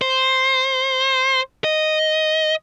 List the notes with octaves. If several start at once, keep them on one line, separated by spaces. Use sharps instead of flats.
C5
D#5